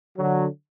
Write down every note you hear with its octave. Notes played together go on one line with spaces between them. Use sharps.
D3 F#3